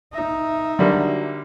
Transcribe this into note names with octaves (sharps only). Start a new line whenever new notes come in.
D#4 E5
D3 F#3 G3 A#3